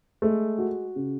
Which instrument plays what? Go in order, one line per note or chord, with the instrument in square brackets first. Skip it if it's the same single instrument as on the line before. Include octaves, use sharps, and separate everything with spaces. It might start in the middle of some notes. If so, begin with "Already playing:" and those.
[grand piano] G#3 [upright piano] A3
[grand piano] F#4
C#3